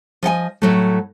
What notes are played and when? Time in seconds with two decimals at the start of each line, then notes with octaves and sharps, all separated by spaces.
0.23 F3 D#5 F#5 G#5
0.62 A2 F#3 A3